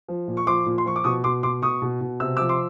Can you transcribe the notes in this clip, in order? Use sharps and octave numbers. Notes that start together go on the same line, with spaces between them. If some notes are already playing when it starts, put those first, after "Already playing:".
F3
A#2
C#6
F3 C6 D6
A#2
C6
F3 C#6
D6
B2 C#6 D#6
B2 C6 D6
B2 C6 D6
B2 C#6 D#6
B2
B2
C3 E6
D6 E6
F3
C6 D6